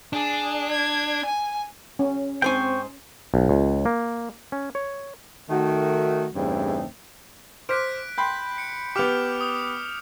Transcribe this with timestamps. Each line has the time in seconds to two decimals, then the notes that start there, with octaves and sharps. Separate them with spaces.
0.13 D4 G#4
0.71 G#6
1.25 G#5
1.99 C#4
2.42 G#2 C4 C5 G5 G#5 C#6
3.34 B1
3.49 C#2
3.85 A#3
4.52 C#4
4.75 C#5
5.50 D#3 A3 F#4
6.35 E2 G2 C#3 A3 C4 D#4
7.69 C5 D6 F6 F#6 B6 D7
8.18 G5 B5 C6 G6 B6
8.58 C#7 D7
8.96 B3 G4 D6 F6 F7
9.41 D#6